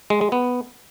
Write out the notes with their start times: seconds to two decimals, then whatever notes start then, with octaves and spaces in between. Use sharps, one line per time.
0.10 G#3
0.21 G#3
0.32 B3